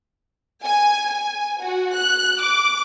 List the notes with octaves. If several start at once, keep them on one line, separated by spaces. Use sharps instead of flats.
G#5
G#5
F#4
F#6
D6